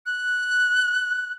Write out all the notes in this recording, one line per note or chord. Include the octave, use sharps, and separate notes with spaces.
F#6